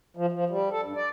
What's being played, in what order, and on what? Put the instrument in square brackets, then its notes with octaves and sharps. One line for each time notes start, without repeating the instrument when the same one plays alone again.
[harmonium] F3
F3
G3
A4
G2
D5